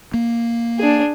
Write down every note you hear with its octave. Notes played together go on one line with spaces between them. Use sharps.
A#3
D4 G#4